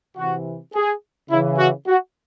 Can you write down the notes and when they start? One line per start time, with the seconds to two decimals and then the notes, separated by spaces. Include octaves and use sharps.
0.17 C3 E3 F#4
0.74 G#4
1.31 C#3 E3 E4
1.59 F#4
1.87 F#4